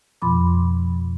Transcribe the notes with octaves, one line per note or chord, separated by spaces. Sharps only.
F2 B2 F3 B5 C6 D6